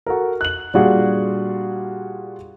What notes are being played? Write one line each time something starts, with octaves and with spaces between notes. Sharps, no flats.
F#4 A4 A#4
F#6 F#7
A#2 G3 D4 F4 F#4 G#4